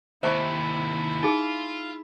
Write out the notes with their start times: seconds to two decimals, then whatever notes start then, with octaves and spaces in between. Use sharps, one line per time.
0.23 D#2 C3 E4 C5 E5 A5 C#6
1.23 D#4 F4 G#4